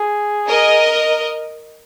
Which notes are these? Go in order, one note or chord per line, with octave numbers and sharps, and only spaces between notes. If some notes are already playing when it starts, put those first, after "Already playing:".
Already playing: G#4
A#4 D#5